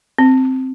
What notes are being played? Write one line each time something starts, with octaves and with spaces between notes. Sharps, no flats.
C4